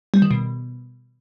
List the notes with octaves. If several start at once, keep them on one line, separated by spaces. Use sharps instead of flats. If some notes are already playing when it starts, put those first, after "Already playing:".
G3
D#3
B2